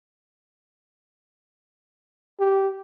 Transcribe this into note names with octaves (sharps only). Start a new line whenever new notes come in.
G4